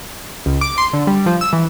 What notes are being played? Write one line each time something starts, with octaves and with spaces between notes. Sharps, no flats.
C#2
D6
C6
D3
G3
F3
E6
E3